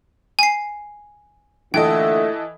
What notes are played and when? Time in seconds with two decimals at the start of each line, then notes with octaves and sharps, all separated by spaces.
0.39 G#5 C7
1.74 A#2 D3 E3 A3 A4 D#5 G5